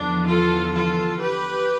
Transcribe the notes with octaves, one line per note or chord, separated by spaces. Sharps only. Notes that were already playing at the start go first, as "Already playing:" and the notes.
Already playing: E2 D3 F3 D4
F4 A4
F4 A4
G4 B4